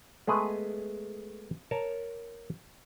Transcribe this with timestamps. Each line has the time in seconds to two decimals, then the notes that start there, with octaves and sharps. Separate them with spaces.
0.27 G#3 A3 B3 G#4 B4
1.71 A#4 C#5 A5 A#5